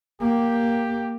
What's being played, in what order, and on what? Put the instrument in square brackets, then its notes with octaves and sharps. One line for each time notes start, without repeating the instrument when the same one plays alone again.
[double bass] A#3 [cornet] G4